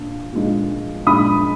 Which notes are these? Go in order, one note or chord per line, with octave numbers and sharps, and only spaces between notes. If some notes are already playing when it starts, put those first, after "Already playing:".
Already playing: A#2 D4
A#2 G#3 D4
A#2 G#3 D4 B5 D#6